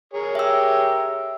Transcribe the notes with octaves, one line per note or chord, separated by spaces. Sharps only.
G#4 A#4 C#5
G4 E5 E6